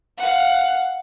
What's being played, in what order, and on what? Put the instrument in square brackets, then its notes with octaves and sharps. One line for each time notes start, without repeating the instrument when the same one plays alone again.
[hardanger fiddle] F5 F#5